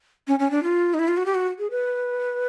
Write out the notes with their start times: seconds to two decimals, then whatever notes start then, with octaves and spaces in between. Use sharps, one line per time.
0.28 C#4
0.39 C#4
0.51 D4
0.63 F4
0.94 D#4
0.99 E4
1.08 F4
1.17 F#4
1.26 G4
1.35 F#4
1.59 G#4
1.71 B4